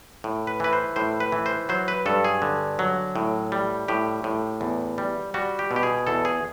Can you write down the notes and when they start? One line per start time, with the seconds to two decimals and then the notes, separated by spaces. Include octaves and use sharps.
0.24 A2
0.47 B4
0.60 E3 B4
0.73 C5
0.96 A2 C5
1.20 B4
1.32 E3
1.46 C5
1.69 F#3 C5
1.88 B4
2.06 G2 A4
2.25 G#4
2.42 D3
2.79 F#3
3.16 A2
3.52 G3
3.88 A2 G4
4.24 A2
4.61 E2
4.98 G3
5.34 G3 F#4
5.59 G4
5.71 B2
5.76 G4
5.83 G#4
6.07 E2 A4
6.25 G#4